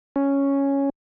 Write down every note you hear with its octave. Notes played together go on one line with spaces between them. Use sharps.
C#4